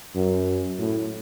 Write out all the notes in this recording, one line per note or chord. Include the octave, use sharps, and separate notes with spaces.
F#2
A2